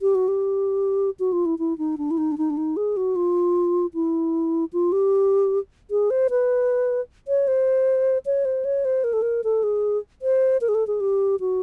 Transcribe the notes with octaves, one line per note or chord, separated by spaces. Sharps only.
G4
F#4
G4
F#4
F4
E4
E4
D#4
D4
E4
D#4
D4
D#4
D4
D#4
G#4
F#4
F4
E4
F4
G4
G#4
C5
B4
C#5
C5
C#5
C5
C#5
C5
A#4
A4
A#4
A4
G#4
C5
A#4
G#4
A4
G#4
G4
F#4